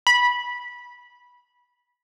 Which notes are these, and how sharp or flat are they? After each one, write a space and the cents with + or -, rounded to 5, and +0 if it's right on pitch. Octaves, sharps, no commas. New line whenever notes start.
B5 -20